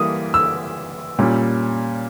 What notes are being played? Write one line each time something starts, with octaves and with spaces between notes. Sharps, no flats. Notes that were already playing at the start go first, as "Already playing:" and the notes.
Already playing: E3 G3 A#3 D#6
E6
A#2 G3 C#4